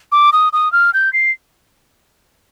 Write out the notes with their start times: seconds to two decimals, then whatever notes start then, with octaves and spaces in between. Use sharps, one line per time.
0.12 D6
0.33 D#6
0.53 D#6
0.72 F6
0.94 G6
1.13 C7